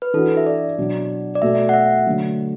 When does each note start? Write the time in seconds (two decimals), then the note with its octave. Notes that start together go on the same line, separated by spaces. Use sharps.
0.02 B4
0.14 E3 D4 F#4 A4
0.37 E5
0.46 D5
0.78 B2 F#3 D4
1.35 D5
1.42 B2 A3 F#4 A4 E5
1.69 F#5
1.73 E5
2.06 D3 F#3 A3 F#4